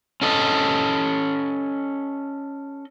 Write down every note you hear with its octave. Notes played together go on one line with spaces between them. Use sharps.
C#4 A4 D#5